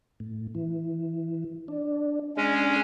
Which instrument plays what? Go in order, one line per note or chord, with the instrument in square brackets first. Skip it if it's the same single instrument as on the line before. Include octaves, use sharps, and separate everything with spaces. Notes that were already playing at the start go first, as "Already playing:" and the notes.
[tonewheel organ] A2
E3
D4
[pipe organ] G#3 C#4 [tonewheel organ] D4 G#4